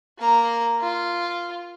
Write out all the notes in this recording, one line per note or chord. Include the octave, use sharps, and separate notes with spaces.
A#3 A#5
F4